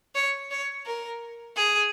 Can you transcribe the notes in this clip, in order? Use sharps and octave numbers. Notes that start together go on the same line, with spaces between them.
C#5
C#5
A#4
G#4